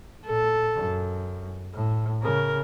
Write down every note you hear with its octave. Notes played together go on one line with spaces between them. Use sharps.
A#2 A4
F#2
A2
C#3 A#4